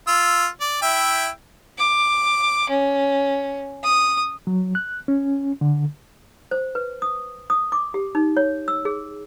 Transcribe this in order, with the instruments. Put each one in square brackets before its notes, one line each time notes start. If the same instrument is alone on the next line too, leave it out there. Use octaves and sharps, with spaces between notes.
[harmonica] F4 E6
D5
E4 E5 G5
[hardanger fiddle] D6
C#4
D#6
[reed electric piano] F#3
F#6
C#4
D3
[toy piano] C5
B4
D#6
D#6
D6
G4
D#4
C#5
E6
G#4